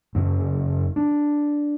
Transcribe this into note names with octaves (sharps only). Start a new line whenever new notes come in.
F#1 F#2 C#3
D4